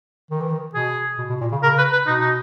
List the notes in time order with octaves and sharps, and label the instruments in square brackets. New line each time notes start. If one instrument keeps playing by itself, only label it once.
[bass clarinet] D#3
E3
D#3
[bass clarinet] B2 [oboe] G#4
[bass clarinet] B2
B2
A#2
C#3
[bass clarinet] C#3 [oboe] A#4
[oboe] B4
B4
[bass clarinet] B2 [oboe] D#4
[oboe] D#4